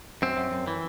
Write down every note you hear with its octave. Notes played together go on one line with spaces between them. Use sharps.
F#2 C4
F#2
F#2
E3